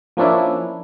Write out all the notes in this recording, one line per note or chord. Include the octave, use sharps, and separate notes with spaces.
F3 A#3 C#4 D4 E4